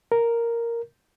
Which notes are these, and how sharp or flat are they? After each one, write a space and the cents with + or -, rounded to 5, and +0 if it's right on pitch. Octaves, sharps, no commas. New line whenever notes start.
A#4 +0